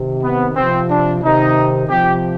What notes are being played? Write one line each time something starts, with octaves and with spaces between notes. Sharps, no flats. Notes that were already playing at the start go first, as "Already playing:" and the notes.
Already playing: C3 D#3
B3
C3 F3 C4
D4
C3 D#3 D#4
C3 F3 G4